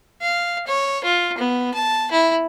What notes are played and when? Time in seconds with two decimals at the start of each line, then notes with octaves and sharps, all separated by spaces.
0.22 F5
0.67 C#5
1.04 F4
1.38 B3
1.74 A5
2.11 E4